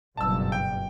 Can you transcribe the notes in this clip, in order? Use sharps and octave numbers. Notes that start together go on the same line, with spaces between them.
F#1 G2 B2 A5 E6
G5